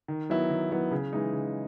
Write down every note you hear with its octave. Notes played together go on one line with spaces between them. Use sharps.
D#3
F#3 B3 E4
D#3
F#3 B3 E4
C#3
E3 G#3 D#4
C#3